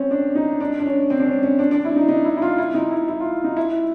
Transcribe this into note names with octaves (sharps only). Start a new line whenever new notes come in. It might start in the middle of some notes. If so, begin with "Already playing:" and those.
Already playing: C4 C#4
D4
D#4
D4
D4
C#4
C4
D4
C#4
C#4
D4
D4
E4
D#4
D#4
E4
E4
F4
E4
D#4
E4
E4
F4
D#4
E4